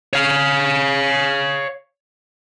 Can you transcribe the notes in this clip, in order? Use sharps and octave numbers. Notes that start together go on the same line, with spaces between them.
C#5 F5